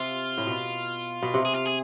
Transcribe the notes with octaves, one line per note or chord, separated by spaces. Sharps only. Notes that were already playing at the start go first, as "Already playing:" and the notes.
Already playing: C3 F4
A2
B2
B2
C3
G#4
F4
G#4